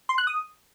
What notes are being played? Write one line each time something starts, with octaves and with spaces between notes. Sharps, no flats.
C6
F#6
D#6